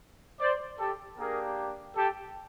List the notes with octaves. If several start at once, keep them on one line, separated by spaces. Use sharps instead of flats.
C5 D5
G4 A4
A#3 D4 G4 G#4 A#4
G4 A4